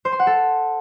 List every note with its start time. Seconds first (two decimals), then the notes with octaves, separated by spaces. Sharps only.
0.05 C5
0.12 C6
0.19 F#5
0.27 A4